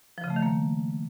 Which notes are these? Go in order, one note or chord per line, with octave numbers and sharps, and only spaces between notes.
F3
C#3
A3
D#3
A#3